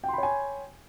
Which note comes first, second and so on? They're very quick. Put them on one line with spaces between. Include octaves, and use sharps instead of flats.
G5 C6 B5 C#5 G#5